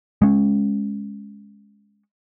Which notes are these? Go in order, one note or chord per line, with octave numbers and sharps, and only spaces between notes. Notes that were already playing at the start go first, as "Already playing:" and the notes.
G#3 C#4